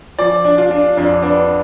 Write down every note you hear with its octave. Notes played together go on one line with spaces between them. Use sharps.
F3 D5
D4
F4
D4
F2 D4
B3 D4